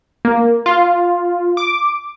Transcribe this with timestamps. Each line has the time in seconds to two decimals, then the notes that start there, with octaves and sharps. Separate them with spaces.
0.25 A#3
0.66 F4
1.57 D6